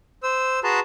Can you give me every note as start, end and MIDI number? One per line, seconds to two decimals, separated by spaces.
0.23 0.60 72
0.23 0.60 88
0.64 0.80 66
0.64 0.80 68
0.64 0.80 71
0.64 0.80 81
0.64 0.80 82
0.64 0.80 84